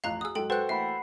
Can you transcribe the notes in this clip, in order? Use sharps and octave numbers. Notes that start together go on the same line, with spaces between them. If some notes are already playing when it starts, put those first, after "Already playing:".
A1 F2 F5 A#5 F#6
F#4 G#4 D#6 E6
G#2 F#3 A4 G5
F#4 A4 B4 C5 F#5 G5 F#6
E3 A3 A#3 E5 F#5 B5 C7
C7